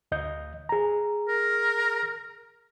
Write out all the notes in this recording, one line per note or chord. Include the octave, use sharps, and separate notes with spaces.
D2 D#5 G6
G#4 A#5
A#4